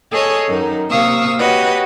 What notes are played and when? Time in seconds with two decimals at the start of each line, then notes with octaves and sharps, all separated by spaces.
0.11 G#4 A4 C#5 D#5
0.48 F#2 D#3 D#4
0.90 C3 A#3 F5 C#6 D#6 E6
1.39 F#4 G4 B4 C#5 D#5